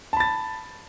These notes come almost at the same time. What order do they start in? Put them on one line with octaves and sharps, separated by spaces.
A5 B5 A6